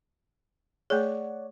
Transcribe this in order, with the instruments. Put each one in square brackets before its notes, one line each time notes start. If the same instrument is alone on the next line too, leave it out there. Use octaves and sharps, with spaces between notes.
[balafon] A3 G#4 [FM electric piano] C#5 D5 F#5